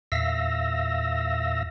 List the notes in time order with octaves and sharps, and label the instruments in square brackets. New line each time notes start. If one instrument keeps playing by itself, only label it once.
[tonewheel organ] E2 A#2 E5 F5 E6 A#6